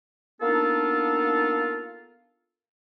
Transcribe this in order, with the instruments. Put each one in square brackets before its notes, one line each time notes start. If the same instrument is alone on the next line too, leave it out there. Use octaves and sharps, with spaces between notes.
[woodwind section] A#3 B3 D4 D#4 F4 A4